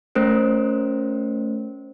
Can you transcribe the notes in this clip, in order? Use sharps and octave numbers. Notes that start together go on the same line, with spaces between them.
A3 C#4 A#4 C5